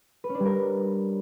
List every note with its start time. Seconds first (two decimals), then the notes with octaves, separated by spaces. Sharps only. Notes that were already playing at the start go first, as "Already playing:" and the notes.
0.24 B4
0.29 C#4
0.35 D4
0.40 G3
0.45 A#4